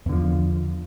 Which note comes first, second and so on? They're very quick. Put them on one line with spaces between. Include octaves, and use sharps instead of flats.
E2 D3 F3